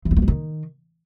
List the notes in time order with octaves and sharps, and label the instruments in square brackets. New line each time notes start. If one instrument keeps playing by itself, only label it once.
[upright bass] E3
C4
A3
G#3
D#3